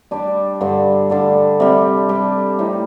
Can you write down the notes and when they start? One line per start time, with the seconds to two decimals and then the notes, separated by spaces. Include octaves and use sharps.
0.11 G3 D4 G4 D5
0.61 G2 D3 G3 D4
1.10 D3 G3 D4 A4
1.60 C3 G3 C4
2.09 G3 D4 A4 D5
2.59 A2 G3 C4 D#4